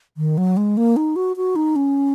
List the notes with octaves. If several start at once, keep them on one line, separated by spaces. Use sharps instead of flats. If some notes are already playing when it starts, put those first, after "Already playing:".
D#3
F#3
G#3
A#3
D#4
F#4
F#4
D#4
C#4